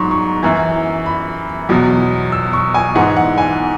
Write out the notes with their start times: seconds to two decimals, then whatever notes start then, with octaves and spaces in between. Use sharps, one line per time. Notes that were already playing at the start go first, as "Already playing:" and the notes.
Already playing: G#2 F#3 C#6
0.11 C#6
0.43 F#2 E3
1.06 B5
1.69 E2 B2 F#3
2.32 E6
2.53 C#6
2.74 G#5
2.95 G#2 E3 F#5
3.17 F#5
3.38 G#5